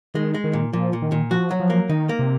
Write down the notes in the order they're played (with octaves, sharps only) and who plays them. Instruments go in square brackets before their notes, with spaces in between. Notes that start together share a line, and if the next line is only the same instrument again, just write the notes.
[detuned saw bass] D#3 [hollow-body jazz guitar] G#3
[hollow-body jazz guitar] G#3
[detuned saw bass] D#3
[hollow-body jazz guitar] A#2
[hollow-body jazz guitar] A#2 [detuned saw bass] F3
[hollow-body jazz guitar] A#2
[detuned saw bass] D#3
[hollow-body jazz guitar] A#2
[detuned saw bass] F3 [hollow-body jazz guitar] F#4
[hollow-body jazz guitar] F#3
[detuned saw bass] F3
[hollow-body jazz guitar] A#3
[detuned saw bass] D#3 [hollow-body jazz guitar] D#4
[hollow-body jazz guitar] A#3
[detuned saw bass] C3